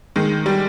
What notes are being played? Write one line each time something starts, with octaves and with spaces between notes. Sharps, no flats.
D#3 G#3
G3